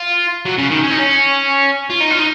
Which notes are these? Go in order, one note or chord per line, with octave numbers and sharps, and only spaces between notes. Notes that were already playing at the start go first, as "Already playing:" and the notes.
Already playing: F4
F#3
C#3
D#3
C#4
D#4
C#4
F4
D#4
F4
D#4